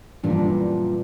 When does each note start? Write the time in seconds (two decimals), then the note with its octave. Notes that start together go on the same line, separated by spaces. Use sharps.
0.24 F#2 A#2 E3 F3 G3 D4